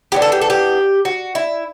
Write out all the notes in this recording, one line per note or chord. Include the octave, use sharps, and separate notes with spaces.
E3 B3 D4 G4
A4
G4
A4
G4
F#4
E4